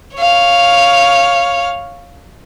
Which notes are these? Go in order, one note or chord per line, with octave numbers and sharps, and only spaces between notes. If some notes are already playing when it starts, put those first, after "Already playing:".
C#5 F5